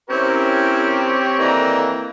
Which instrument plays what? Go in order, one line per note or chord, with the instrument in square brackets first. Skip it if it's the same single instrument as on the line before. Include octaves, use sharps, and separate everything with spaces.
[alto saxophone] C4 [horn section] C#4 E4 A#4 [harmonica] G4 C5 C#5
[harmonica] E3 A#3 D#4 [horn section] A4 D5 A#5